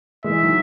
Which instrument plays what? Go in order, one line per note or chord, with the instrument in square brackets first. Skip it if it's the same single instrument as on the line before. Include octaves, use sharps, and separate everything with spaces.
[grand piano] E3 G#3 [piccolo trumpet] E5
[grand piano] D#3 F#3